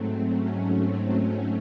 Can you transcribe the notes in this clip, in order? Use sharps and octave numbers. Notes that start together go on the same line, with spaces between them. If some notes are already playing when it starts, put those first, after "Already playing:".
Already playing: G#2 F#3 A3 C4
C#4
C4
C#4